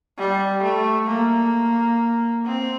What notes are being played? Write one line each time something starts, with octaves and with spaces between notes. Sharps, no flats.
G3
A3
A#3
C4